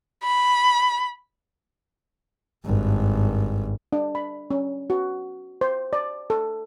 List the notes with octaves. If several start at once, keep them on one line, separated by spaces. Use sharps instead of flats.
B5
G#1 G2
D4
B5
C#4
F#4
C5
D5
A4